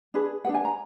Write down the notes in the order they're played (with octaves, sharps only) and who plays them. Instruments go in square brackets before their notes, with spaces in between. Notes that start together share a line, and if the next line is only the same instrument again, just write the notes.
[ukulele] D4 G#4 B4
D4 G#4 B4 F#5
G#5
A#5